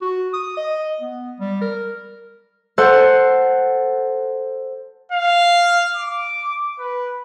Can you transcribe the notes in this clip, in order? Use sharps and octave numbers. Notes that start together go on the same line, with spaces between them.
F#4
D#6
D#5
B3
G3
A#4
A4 C5 F#5
F5
D6
B4